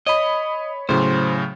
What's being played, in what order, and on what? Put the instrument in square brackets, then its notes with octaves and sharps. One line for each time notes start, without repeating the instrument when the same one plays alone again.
[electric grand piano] C#5 B5 [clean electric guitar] D#5
[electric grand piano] A2 C#3 F#3 [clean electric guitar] C5